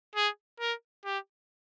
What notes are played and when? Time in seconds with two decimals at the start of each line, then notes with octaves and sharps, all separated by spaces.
0.15 G#4
0.60 A#4
1.05 G4